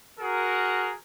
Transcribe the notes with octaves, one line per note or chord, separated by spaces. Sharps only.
F#4 G#4 A#4